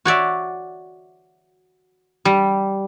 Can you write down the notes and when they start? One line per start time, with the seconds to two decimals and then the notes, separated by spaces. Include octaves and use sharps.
0.05 F#4 C#5 D5 E5
2.25 G3